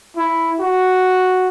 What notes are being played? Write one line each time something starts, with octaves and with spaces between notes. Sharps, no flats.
E4
F#4